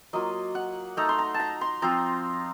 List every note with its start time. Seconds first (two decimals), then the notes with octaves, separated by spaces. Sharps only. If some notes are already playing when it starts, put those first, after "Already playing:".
0.13 F#3 A#3 F4 D#5
0.55 F#5
0.97 A3 D#4 A#5
1.09 C6
1.19 A#5
1.34 A5
1.40 A#5
1.61 C6
1.82 F3 C4 F4 A#5